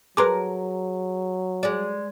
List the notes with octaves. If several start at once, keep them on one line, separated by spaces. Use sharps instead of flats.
F#3 G#4 A#4 B4 C6 D6
G#3 D5